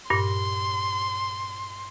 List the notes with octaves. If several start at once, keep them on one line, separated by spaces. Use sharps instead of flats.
G2 A#2 C6